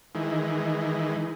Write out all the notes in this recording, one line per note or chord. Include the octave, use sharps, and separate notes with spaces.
D#3 E3 G#3